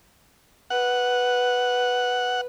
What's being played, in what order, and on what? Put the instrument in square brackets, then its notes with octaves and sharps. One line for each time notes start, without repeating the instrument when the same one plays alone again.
[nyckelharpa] B4 [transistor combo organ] F#5